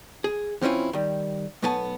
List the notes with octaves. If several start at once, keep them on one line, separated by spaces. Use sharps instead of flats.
G#4
E3 C4 C#4 E4 F4
D#3 G3
B1 A3 B3 G#5 A5